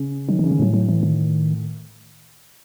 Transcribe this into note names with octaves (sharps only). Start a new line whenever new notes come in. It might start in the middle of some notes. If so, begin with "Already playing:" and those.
Already playing: C#3
D#3 F#3
C#3 E3
D#3
A2 F#3
F#3
E3
D#3